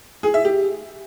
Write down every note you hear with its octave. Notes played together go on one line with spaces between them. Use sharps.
G#4
E5
G4